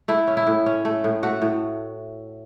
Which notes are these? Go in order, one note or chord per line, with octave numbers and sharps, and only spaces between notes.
A3 E4
C#4
E4
A2
C#4
A3
A2
A3 F#4
A2